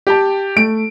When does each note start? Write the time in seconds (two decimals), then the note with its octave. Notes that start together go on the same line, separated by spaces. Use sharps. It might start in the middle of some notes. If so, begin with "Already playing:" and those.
0.07 G4 G5 A5
0.56 A3 D7